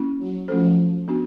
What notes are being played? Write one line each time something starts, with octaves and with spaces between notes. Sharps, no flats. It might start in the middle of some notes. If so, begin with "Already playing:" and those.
Already playing: A#3 C#4 E4
F#3
F3 A3 C#4 F#4 A4 C5
B3 D4 F#4